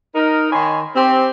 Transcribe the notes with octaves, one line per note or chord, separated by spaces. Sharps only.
D#4 A#4
D#3 D#4 C#5 G#5 B5 C6
C4 G4